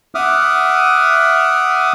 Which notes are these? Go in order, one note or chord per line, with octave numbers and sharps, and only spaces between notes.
E5 F#5 D6 D#6 F6